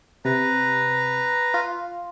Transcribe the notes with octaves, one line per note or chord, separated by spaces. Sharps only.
C3 B4 A#5
F4